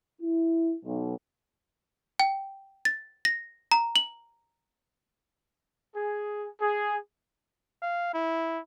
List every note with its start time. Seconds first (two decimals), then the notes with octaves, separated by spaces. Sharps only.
0.21 E4
0.85 B1
2.20 G5
2.85 A6
3.25 A#6
3.72 A#5
3.96 F#7
5.94 G#4
6.60 G#4
7.82 F5
8.14 E4